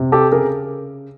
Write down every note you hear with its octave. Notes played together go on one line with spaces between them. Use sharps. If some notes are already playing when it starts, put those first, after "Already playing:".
Already playing: C3
G4 A4
C#3 G#4 A#4